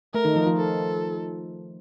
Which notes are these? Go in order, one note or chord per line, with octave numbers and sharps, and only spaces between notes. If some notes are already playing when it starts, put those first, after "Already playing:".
A3 A#4
D#3 D#4
F3 F4
F3 F4
A4